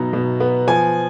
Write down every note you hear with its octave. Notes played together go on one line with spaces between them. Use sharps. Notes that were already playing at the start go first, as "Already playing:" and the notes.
Already playing: B2 F#3 D#4 A#5
B2
B3
F3 G#5